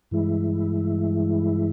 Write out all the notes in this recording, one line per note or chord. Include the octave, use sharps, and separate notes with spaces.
G2 E3 G#3 E4